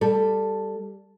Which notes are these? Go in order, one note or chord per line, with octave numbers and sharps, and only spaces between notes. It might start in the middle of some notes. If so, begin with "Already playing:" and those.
G3 A4